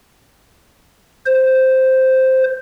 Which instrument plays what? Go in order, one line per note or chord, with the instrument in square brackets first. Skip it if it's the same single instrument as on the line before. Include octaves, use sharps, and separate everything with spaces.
[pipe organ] C5